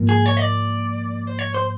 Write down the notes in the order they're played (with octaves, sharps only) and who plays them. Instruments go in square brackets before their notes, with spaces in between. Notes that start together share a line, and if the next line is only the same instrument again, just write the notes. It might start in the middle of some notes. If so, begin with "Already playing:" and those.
Already playing: [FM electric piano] G#2 F3 A#3
[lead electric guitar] G#4
C#5
D#5
D5
C5
C#5
C5